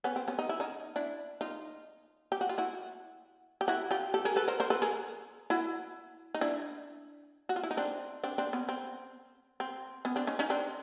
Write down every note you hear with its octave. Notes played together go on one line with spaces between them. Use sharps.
B3 C#4
C4
B3 C#4
D#4
E4
C#4 D#4
D4 E4
D#4 F4
G4
F#4
F4
E4 F#4
G4
E4 F#4
F4 G4
G4 A4
G#4 A#4
A4 B4
A#4 C5
A#4 C5
A4 B4
G#4 A#4
E4 F#4
D#4
D4 E4
F#4
F4
E4
D#4
C4 D4
C4 D4
C4 D4
B3 C#4
C4
C4
B3 C#4
C4 D4
C#4 D#4
C#4 D#4
C4 D4